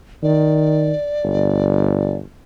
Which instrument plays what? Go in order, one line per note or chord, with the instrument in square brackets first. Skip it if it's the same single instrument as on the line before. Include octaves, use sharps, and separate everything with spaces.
[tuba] D#3 [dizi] D5
[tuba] G1